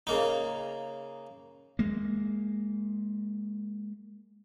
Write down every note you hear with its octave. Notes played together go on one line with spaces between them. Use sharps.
C#3 A#3 D#4
G#3 A#3